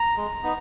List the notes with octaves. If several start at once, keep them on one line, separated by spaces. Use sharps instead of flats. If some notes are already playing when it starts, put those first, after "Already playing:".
Already playing: A#5
G#3
B3 D#4